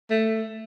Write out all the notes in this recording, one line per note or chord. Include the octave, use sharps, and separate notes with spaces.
A3